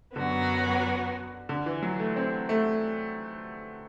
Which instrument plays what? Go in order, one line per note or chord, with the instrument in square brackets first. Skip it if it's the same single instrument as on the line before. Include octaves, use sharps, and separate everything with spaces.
[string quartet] F#2 F#3 B3 F#4 [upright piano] D3
[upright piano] D3
E3
F#3
A3
C4
A3